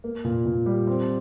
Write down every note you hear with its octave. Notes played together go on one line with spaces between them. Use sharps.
A#3
A#2
A#2
G3
C4